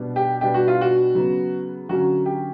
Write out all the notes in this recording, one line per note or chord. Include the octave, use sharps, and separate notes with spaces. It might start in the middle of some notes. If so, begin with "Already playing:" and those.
Already playing: B2 G3 B3 D4
G4
B2 G3 B3 D4 G4
F#4
F4
F#4
C#3 F#3 B3
D3 F#3 A#3 C#4 F#4
G4